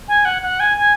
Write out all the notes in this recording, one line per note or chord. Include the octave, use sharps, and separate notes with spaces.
G#5
F#5
F#5
G#5
G#5